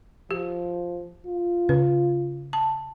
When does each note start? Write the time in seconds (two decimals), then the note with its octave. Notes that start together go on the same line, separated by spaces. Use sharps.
0.31 F3 G4
1.27 F4
1.69 C#3 B4
2.53 A5